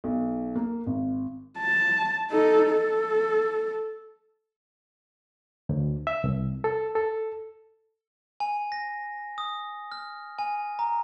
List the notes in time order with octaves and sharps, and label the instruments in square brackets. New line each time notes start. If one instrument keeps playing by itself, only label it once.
[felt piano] B1
A#3
G#1
[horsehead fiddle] A5
D#4 A4
A4
[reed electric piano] D2
E5
C2
A4
A4
[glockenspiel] G#5
A#6
D#6
F6
G#5
A#5